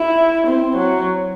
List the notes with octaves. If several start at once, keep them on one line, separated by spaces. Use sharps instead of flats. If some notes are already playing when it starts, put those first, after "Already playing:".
Already playing: E4
C4
F#3